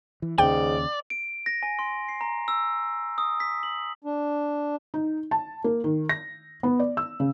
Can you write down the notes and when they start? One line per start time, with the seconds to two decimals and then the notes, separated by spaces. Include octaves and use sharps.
0.22 E3
0.38 D#2 G#2 C#3 D5 G5
1.10 D7
1.46 A#6
1.63 G#5
1.79 C6
2.08 C7
2.21 A#5
2.48 E6
3.18 D#6
3.40 B6
3.63 F#7
4.04 D4
4.94 D#4
5.31 A5
5.64 A#3
5.84 D#3
6.09 A#6
6.63 B3
6.80 D5
6.97 E6
7.20 C#3